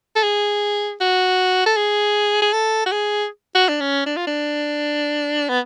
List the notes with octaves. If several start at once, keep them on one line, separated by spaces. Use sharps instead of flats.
A4
G#4
F#4
A4
G#4
G#4
A4
F#4
G#4
F#4
D4
C#4
D4
F4
D4
B3